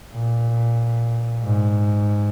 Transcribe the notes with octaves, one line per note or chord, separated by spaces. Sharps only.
A#2
G#2